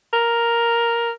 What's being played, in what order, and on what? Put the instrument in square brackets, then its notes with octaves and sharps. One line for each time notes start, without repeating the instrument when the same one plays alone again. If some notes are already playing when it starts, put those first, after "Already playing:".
[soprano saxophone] A#4